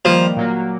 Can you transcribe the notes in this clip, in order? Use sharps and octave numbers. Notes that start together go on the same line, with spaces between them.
D#3 F3 G3 A#3
A#2 F#3 A#3